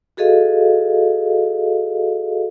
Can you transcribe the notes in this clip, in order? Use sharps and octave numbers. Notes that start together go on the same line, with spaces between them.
F#4 G#4 A4 D#5 F5